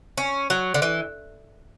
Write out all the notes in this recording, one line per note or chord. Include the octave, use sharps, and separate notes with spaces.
C#4
F#3
D3
E3